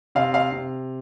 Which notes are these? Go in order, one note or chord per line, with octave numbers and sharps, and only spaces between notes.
C3 F5
F5
C3